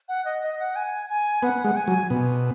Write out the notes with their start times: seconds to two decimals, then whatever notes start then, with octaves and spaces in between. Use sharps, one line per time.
0.08 F#5
0.25 D#5
0.43 D#5
0.59 F#5
0.76 G#5
1.09 G#5
1.43 B3 F#5
1.64 G#3
1.76 G#5
1.88 F#3
2.10 B2